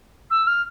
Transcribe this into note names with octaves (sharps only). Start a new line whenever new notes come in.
E6
F6